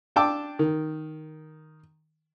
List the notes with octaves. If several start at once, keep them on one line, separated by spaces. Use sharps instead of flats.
D4 G5 A5 D6 E6
D#3